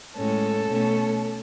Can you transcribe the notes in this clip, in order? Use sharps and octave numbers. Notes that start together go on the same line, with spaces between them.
A2 G#3 C#4 A4
B2 A3 C#4